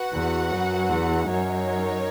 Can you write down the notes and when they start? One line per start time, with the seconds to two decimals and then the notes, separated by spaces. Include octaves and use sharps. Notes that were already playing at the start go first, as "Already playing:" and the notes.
Already playing: F#4 B4 F#5
0.13 E2
0.51 F#2
0.89 E2
1.28 F#2 D#4 A#4 C#5